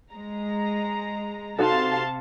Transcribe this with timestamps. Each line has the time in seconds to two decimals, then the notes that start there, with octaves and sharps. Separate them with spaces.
0.12 G#3 A#5
1.59 C3 D#4 F#4 A4 F5 A5 C6